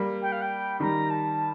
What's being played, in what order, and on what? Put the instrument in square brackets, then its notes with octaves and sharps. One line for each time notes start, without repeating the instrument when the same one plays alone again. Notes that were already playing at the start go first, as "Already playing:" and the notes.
Already playing: [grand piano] G3 A#3
[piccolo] G5
F5
G5
[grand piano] D#3 G3 [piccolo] A#5
[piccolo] A5